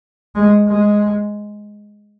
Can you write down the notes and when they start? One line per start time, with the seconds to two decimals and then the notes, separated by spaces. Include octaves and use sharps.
0.35 G#3
0.69 G#3